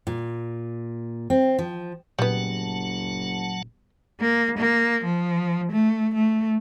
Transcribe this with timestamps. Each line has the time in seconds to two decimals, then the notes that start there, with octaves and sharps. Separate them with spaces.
0.07 A#2
1.30 C4
1.58 F3
2.19 F#1 A#2 F#3 G3 B3 F#5 A5
4.20 A#3
4.58 A#3
5.05 F3
5.72 A3
6.14 A3